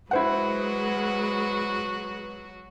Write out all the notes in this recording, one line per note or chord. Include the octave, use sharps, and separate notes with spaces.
F#3 G#3 E4 F#4 B4 C5 F#5